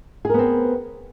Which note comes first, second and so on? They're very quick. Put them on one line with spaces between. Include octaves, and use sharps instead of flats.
G#4 A#4 B3 C4